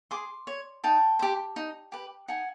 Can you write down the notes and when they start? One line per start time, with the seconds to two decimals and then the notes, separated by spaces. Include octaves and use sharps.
0.11 G#4 C6 D6
0.47 C#5
0.84 D#4 G5 A5
1.19 G4 C5
1.56 D#4
1.92 G4 B4
2.28 D#4 F#5 G#5